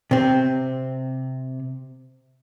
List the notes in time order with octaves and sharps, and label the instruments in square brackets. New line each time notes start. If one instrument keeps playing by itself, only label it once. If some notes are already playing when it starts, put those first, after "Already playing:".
[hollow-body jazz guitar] C3 C4